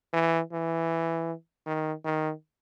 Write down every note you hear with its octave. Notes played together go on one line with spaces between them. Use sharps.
E3
E3
D#3
D#3